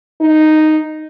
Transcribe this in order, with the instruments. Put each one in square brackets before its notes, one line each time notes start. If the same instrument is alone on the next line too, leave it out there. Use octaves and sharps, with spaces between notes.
[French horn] D#4